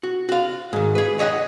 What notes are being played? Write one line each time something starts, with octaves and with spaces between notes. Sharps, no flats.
F#4
F#4 F5
G#2 D#3
G#4 B4
C#5 D#5 E5 F#5